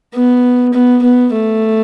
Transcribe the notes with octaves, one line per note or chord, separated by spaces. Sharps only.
B3
B3
B3
A3